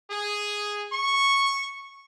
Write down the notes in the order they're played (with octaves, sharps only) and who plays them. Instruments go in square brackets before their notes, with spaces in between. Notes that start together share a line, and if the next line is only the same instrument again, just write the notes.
[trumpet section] G#4
C#6